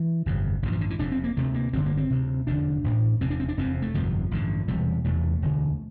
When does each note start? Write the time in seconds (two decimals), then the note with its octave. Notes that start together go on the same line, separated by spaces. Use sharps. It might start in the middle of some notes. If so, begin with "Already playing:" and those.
Already playing: E3
0.26 G1 F2 C3
0.63 A1 G2 D3 E3
0.72 F3
0.81 D3
0.90 E3
0.99 F1 F2 C3 D4
1.12 C4
1.24 A#3
1.37 D2 C3 A3
1.54 A#3
1.73 G1 F2 D3 C4
1.86 A#3
1.97 C4
2.10 D2 C3
2.47 F1 E2 D3 D4
2.84 A1 A2
3.21 F1 E2 C3 C4
3.30 D4
3.40 C4
3.48 D4
3.57 F1 E2 C3 C4
3.82 A3
3.94 G1 F2 C3 F3
4.31 A1 G2 D3
4.68 E1 E2 C3 G3
5.04 E1 E2 C3 A3
5.42 E1 D2 D3